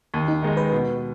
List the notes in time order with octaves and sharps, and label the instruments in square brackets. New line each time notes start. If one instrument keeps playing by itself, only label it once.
[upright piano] D#2
[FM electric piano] D#4
[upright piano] D#3 G#3 D#4
[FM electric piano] B4
[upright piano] B2